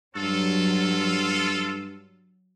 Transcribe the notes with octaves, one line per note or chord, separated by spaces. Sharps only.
G2 F#3 F4 A4